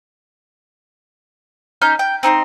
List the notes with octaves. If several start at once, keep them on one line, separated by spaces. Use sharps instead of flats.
C#4 D#4 F6 G6
G5
C4 D#4 G5 C6